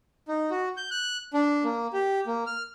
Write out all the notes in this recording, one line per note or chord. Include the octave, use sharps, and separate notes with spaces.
D#4
F#4
G6
F#6
D4
A#3
G4
A#3
F6